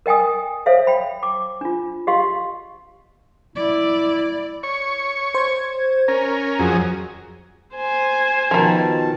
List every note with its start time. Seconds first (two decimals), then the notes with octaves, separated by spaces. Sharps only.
0.06 A#4 D#5 G5 G#5 D#6
0.66 A4 C5 C#5 E5 F5
0.87 G5 B5
1.23 D6
1.61 D4 F4
2.07 G4 D#5 F5 C6 C#6
3.56 E4 D5
4.63 C#5 C#6
5.35 C5 G#6
6.08 C#4 A#4 A#5
6.59 F2 F#3 G#4
7.76 C5 G#5
8.51 B2 D#3 F3 A5